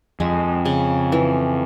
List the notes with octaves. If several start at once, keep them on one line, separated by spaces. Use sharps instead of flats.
F2 G#3
C#3
E3